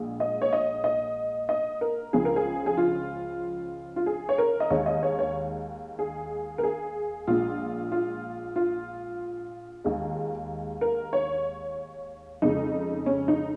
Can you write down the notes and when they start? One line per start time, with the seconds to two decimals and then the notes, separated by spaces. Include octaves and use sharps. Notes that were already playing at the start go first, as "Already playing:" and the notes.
Already playing: A#1 A#2 G#3
0.20 D#5
0.42 C#5
0.53 D#5
0.84 D#5
1.49 D#5
1.81 A#4
2.13 C#2 C#3 F3 G#3 G#4
2.25 A#4
2.36 G#4
2.66 G#4
2.77 F4
3.96 F4
4.06 G#4
4.29 C#5
4.38 A#4
4.60 D#5
4.70 D#2 D#3 G#3 C#5
4.86 D#5
5.03 C#5
5.19 C#5
5.99 G#4
6.58 A#4
6.63 G#4
7.27 A#1 A#2 G#3 F4
7.92 F4
8.56 F4
9.84 D#2 D#3 G#3
10.81 A#4
11.13 C#5
12.42 F2 C#3 G#3 D#4
13.06 C#4
13.28 D#4